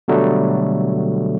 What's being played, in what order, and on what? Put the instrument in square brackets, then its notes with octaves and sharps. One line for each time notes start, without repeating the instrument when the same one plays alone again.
[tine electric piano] B2 D3 F#3 G3 A3